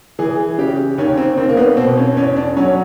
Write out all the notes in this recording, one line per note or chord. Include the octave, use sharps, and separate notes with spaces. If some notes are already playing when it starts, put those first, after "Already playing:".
E3 G#4
C#3 G4
D#2 C#4
C4
D#2 C4
A#3
B3
B2 C4
C#4
E2 C#4
D4
F#3 C#4